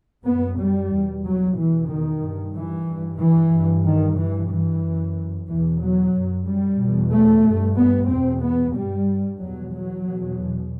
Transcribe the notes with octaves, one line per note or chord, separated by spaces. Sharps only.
F#2 B3
G3
E2 B2
F#3
E2 B2 E3
D#3
G2
E3
G2
E3
G2
D#3
G2 E3
E3
F#2
E2 B2 E3
F#3
F#2
G3
E2 B2
A3
G2
B3
E2 B2 C4
B3
G2 G3
E2 B2 F#3
F#3
E2 B2